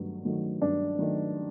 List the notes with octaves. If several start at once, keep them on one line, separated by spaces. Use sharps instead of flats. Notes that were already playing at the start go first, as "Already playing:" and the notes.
Already playing: G2 D#3 F#3 A3
D#3 F#3 A3
G2 D4
D#3 F#3 A3